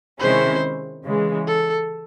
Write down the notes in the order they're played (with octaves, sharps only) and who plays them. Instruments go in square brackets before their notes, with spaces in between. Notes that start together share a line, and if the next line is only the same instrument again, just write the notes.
[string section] C3 D#3 G#3 C#4 E4 [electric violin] C5
[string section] C#3 E3 G#3
[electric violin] A4